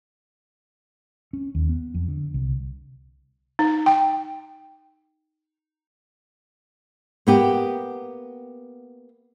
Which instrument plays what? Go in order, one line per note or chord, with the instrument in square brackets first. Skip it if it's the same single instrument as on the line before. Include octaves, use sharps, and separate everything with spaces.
[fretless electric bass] C#4
D#2
B3
F2
D3
C2
[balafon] D#4
G5
[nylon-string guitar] A#3 B3 G4